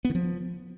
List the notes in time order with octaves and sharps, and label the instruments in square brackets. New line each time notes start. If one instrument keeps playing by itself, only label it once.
[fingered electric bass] B3
D#3
F3